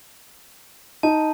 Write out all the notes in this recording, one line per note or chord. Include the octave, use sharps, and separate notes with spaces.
D#4 A5